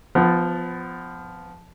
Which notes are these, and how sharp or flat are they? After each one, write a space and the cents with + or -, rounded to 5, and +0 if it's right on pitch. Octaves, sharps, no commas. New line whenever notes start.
F3 +0 B3 +25